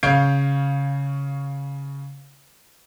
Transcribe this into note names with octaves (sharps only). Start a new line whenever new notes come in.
C#3 C#5 F5 G6 C7 D7